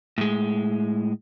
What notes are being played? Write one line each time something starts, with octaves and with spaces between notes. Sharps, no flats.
A2 G#3